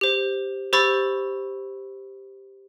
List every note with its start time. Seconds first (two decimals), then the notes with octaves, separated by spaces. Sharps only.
0.01 G4 C5
0.73 G4 C5 B5 C#6 E6 A6